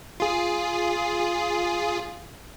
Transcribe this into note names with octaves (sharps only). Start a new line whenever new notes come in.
F4 G#4